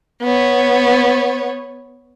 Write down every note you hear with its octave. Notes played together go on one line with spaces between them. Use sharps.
B3 C#5